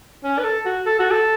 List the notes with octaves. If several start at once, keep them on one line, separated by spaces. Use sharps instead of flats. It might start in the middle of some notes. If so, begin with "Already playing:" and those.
C#4
B4
A4
F#4
A4
F#4
A4